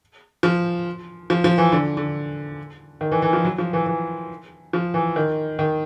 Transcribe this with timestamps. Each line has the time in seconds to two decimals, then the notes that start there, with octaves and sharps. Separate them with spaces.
0.43 F3
1.30 F3
1.44 F3
1.58 E3
1.72 D3
1.97 D3
3.01 D#3
3.12 E3
3.22 E3
3.33 F3
3.45 F#3
3.58 F3
3.73 E3
3.86 E3
4.73 F3
4.94 E3
5.16 D#3
5.59 D#3